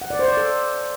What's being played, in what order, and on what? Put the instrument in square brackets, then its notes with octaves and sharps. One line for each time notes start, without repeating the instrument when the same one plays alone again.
[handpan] F#5
D5
C5
D5
A4